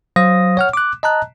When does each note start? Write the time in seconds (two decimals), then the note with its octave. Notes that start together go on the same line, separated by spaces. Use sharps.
0.16 F#3 C5 F5 D#6 A#6
0.57 C#5 F#5 F6
0.73 D6 F#6
1.03 D#5 A5 A#5 F#6